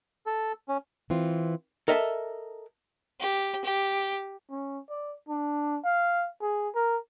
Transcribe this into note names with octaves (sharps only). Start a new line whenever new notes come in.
A4
C#4
E3 C4 F4
A4 A#4 D#5 E5 G5 A5
G4
G4
C#4
D5
D4
F5
G#4
A#4